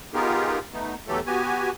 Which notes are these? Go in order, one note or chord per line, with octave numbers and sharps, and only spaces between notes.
B3 D#4 F4 G4 G#4 A#4
A3 B3 D#4
E2 E3 F#3 A3 G4 A4
B3 F#4 G4 G#5